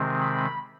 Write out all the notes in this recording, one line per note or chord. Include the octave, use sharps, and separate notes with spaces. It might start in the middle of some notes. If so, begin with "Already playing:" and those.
Already playing: C3 D#3 G#3 C4
B5